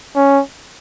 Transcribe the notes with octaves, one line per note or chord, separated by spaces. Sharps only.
C#4